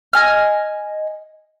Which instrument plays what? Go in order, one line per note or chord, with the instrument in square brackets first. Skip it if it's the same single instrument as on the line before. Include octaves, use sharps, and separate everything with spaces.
[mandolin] D#5 G#5 F6